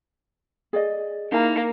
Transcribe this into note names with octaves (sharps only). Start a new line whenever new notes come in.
G#4 D5 D#5
A#3 D#4 E4 A#5